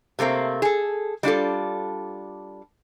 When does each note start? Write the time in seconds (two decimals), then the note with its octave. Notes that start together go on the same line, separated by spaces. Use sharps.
0.19 C3 A3 A#3 C4
0.62 G#4 A4
1.23 G3 D4 F4 A4